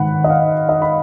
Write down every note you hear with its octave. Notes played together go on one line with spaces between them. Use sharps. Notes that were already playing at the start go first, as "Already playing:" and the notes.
Already playing: G#2 D#3 F#5 B5
D#5
F5
D#5
B5